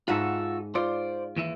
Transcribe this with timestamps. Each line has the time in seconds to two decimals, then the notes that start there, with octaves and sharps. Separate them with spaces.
0.08 G#2 F4 F#4 A4 E5 F#5
0.75 F4 C5 D5
1.36 D#2 E3 E4